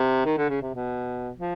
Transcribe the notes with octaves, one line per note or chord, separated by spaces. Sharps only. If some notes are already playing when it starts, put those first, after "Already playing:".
Already playing: C3
D#3
D3
C#3
C3
B2
F3